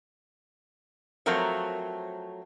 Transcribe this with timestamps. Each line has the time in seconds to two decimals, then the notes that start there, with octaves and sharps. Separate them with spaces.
1.26 F3 F#3 A3 C4 A#4 C#5